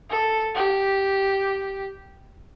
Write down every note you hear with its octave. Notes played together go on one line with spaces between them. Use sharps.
A4
G4